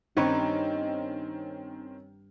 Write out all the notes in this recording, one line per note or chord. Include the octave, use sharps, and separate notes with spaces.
G2 D#3 C4 C#4 D#4 B4 C#5